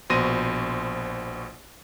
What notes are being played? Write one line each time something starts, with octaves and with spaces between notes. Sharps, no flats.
A#1 B2 C5 C6 A#6 D#7